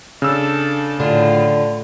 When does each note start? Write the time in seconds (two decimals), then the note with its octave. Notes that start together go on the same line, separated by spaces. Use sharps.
0.22 C#3 D4 A4 E6
1.00 A2 D3 F4